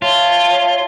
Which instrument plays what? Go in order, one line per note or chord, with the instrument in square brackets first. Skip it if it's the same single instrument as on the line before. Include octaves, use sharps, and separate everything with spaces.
[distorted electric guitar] F4 [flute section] C#5 E5 A5